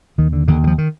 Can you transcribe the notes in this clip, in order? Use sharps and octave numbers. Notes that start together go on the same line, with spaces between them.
D#2 D#3
D3
D#2 D3
D3
F3
D#3